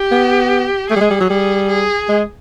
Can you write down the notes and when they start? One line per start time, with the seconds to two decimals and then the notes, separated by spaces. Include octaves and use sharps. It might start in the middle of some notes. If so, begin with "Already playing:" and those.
Already playing: G4
0.11 B3
0.90 A3 G#4
0.96 G3
1.01 G#3
1.10 G3
1.20 F#3
1.30 G3 G#4
1.69 G#4
2.09 G#3